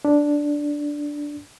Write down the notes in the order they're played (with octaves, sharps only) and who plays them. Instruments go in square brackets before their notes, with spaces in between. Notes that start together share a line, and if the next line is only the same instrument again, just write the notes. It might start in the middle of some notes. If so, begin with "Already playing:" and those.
[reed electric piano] D4